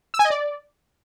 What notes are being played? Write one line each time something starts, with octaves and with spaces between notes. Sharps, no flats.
E6
G#5
D#5
D5